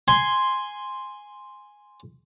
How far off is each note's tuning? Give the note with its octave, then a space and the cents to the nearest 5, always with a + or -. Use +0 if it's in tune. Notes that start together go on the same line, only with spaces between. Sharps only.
G#5 -5 C6 +0